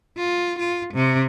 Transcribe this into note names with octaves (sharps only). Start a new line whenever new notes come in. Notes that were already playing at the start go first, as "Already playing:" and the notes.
F4
F4
C3